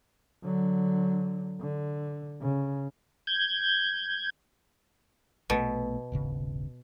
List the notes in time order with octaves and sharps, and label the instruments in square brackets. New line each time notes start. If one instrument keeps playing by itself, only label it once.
[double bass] D3 F#3
D3
C#3
[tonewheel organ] G6 G#6
[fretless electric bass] A#1 A3 B3 [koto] B2
[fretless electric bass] D#1 G#1 C#3